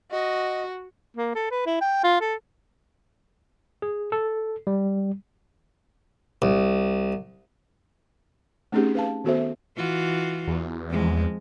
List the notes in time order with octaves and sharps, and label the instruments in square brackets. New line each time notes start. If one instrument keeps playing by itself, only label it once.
[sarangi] F#4 [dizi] D#5
[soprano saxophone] A#3
A4
B4
E4
G5
F4
A4
[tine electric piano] G#4
A4
G3
[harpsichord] C2
[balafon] A3 C4 C#4 D#4 G4 G#4
B4 F5 A5
D#3 B3 F#4 A4 C5 E5
[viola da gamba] E3 F4 F#4
[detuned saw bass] E2
[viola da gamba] F2 G#3